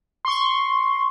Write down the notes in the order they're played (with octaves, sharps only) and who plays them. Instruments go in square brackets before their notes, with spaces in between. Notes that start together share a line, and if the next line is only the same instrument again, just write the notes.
[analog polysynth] C6 C#6